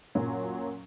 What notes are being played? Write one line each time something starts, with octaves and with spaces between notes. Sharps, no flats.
F#2 A#2 F#3